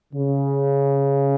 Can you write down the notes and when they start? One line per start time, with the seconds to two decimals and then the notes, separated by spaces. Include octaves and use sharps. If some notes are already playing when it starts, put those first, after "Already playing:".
0.13 C#3